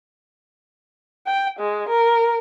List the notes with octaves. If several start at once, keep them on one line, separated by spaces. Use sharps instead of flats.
G5
G#3
A#4